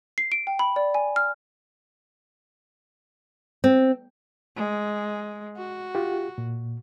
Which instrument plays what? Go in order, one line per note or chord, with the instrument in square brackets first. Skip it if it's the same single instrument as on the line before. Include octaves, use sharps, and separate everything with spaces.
[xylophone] C7
D7
G5
B5
D5
G#5
F6
[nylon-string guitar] C4
[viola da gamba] G#3
F#4
[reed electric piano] F4 G4
A#2